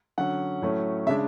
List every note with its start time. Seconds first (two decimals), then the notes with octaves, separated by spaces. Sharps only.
0.18 D3 F#3 C#4 F#5
0.62 A2 F#3 A3 C#4
1.07 C#3 G#3 D4 E5